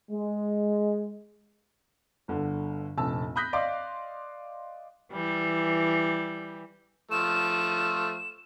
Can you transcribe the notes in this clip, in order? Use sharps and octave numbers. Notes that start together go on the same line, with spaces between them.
G#3
G1 D3
F1 A#1 A5 E6
B5 D#6 F#6 G6 A#6 B6
D5 D#5 F5 C6 D6
E3 G3
F3 A3 E7